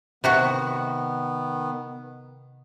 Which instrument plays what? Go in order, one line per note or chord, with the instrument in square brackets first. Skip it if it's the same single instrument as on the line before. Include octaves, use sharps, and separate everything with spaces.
[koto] C3 F#4 F#5 [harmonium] D#3 B3